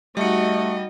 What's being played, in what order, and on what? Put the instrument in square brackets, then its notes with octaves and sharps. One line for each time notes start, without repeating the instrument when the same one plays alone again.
[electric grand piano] G3 C#7 [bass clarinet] A3 [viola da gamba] D#4 F#4 [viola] D#5